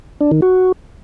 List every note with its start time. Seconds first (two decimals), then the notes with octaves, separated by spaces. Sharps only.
0.21 D4
0.31 D#3
0.42 F#4